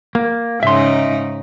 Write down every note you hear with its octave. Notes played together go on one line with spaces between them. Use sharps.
A#3
G#2 C#3 D#4 E5 C6